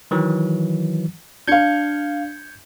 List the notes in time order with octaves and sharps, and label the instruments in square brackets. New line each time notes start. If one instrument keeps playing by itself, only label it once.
[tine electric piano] D#3 E3 F#3
[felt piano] D4 F5 [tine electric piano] G6 G#6 C#7